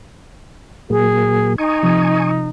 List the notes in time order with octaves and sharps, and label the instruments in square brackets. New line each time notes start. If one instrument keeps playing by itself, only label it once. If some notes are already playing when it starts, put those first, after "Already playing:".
[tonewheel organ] A#2 F#3 A#3 [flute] G#4
[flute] D#4 [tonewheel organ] G#5 C#6 D#6
[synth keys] C3 F3